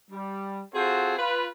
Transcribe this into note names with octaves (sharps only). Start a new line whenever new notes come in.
G3
C4 F4 F#4 G#4 A4 C5
F4 B4